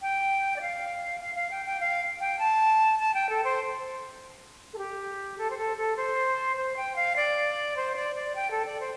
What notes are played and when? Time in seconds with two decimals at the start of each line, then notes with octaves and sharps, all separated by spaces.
0.02 G5
0.56 D5
0.61 F5
1.20 F5
1.35 F5
1.51 G5
1.66 G5
1.80 F5
2.20 G5
2.39 A5
2.99 A5
3.14 G5
3.30 A4
3.44 C5
4.73 A4
4.78 G4
5.38 A4
5.50 C5
5.58 A4
5.78 A4
5.97 C5
6.57 C5
6.77 G5
6.96 F5
7.16 D5
7.77 C5
7.96 D5
8.16 D5
8.35 G5
8.51 A4
8.66 D5
8.80 C5